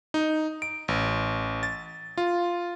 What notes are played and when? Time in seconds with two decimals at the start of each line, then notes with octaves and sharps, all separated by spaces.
0.14 D#4
0.62 D7
0.88 A1
1.63 A6
2.17 F4